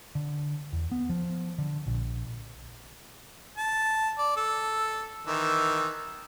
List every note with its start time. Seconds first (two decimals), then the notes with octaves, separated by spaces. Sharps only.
0.15 D3
0.73 E2
0.92 B3
1.10 F3
1.58 D3
1.87 A#1
3.58 A5
4.18 D5
4.37 A4
5.27 D#3 E3 E6